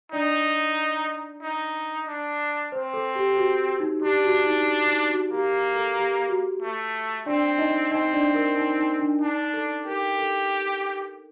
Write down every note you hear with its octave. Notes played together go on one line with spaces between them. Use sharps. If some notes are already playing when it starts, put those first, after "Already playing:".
D4 D#4 D5
D#4
D4
C4 C5
A4
G4
F#4
D#4
D4 G4
F#4
D#4
D#4
F#4
A#3 G4
A4
G4
F#4
A3
C4 D4 D5
D#4 D#5
C4 D#4 D#5
D4 D5
A#4
D#4
D#4
D4
D4 D#4
A4
G4 A#4
A4